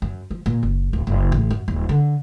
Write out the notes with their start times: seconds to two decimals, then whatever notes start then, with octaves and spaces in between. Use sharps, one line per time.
0.02 F#2
0.30 F3
0.46 A#2
0.63 F#1
0.93 D1
1.07 F#1
1.32 A1
1.51 F#2
1.68 D#1
1.89 D3